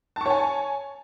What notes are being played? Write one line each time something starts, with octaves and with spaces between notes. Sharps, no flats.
C#5 G#5 A5 C#6